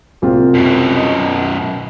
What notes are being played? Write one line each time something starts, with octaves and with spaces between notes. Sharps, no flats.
C2 C4 F4
F#2 B2
D#5